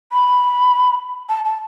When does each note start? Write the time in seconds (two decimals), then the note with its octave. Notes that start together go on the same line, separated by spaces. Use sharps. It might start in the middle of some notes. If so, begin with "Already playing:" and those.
0.13 B5
1.30 A5
1.45 A5